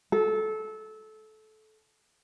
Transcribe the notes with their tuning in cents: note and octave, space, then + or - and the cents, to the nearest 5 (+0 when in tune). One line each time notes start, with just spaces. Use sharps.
A4 -20